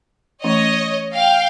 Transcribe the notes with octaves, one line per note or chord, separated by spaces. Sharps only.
E3 A3 C#4 C#5 D#5
F5 G5